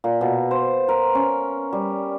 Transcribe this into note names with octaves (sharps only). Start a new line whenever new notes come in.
A#2
B2
C5
A#4
C#4
G3